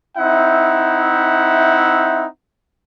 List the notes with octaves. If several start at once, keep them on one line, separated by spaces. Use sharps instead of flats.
C4 D#4 E4 E5 F#5